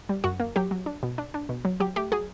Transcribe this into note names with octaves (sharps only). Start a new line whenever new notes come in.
G3
F#2 F#4
A#3
F#3 G4
F#3
D4
B2
D4
D4
B2
F#3
F#3 G4
A3 G4
F#3 G#4